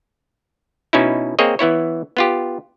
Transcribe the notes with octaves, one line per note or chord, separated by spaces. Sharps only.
B2 C#4 D#4 E4
A#3 C4 G#4 C#5 D#5
E3 B3 E4 C#5
B3 F4 G4